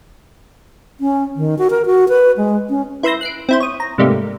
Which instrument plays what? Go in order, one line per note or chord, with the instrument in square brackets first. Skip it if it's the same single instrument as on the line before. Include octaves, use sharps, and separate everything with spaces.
[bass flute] C#4
D#3
F#4
A#4
F#4
B4
G#3
C#4
[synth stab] E4 B4 C6 E6 G6 A#6
F#6 C7 D7
C4 E4 C5
C#5 D#6
A#5
G#2 C3 G3 A3 A#3